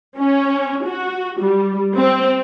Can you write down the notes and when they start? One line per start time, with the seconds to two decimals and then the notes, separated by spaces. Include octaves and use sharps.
0.17 C#4
0.85 F#4
1.40 G3
1.95 C4